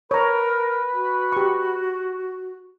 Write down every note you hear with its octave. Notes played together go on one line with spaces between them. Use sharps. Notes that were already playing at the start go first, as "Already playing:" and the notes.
A#4 B4 C#5 A#5
F#4
G4 C#6